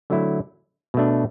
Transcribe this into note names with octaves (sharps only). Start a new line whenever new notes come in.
D3 F#3 A3 E4
B2 A3 D4